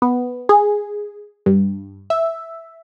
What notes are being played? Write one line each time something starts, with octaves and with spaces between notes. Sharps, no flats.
B3
G#4
G2
E5